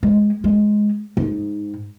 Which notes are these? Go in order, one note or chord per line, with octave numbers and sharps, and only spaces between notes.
G#3
G#3
G#2